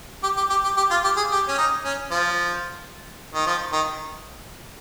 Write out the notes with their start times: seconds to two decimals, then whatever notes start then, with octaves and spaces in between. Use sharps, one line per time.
0.23 G4
0.36 G4
0.50 G4
0.64 G4
0.77 G4
0.90 F4
1.04 G4
1.16 G#4
1.31 G4
1.48 C#4
1.57 D#4
1.84 C#4
2.11 F3
3.34 D#3
3.46 F3
3.72 D#3